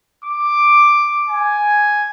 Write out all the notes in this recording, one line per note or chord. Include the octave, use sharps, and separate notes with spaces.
D6
G#5